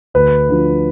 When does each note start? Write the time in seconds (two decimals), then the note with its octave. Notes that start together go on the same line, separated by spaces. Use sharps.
0.14 D2 B4
0.49 D3 F3